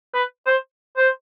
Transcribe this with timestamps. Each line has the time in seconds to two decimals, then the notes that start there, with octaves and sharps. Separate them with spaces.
0.14 B4
0.46 C5
0.97 C5